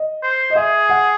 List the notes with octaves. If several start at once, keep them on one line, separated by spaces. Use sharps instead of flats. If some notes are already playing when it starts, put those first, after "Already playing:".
Already playing: D#5
C5
D#5
G#4 E5
F#5